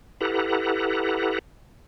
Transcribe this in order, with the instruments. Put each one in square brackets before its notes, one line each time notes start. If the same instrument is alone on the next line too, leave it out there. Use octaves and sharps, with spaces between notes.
[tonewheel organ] E4 G4 A4 B4 F#5 A#5